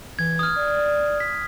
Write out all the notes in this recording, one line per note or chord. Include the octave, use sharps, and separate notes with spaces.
E3 G#6
D#6 F6
D5
B6